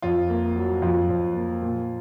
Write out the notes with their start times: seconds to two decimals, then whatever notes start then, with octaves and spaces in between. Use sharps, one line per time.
0.02 F2 F4
0.29 A#3
0.55 F#3
0.82 F2 F4
1.09 F2
1.36 A#3
1.62 A#2